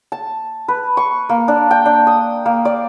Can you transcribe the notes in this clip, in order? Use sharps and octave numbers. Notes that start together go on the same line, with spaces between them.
A5
B4
C#6
A#3
D4
G5
D4
D#6
A#3
D5